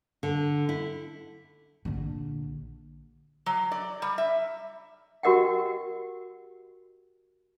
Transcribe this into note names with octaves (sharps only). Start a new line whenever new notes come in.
D3
E4
A#1 D3
F#3
D5
G3
E5
F#4 G4 A#4 D#5 F#5 G5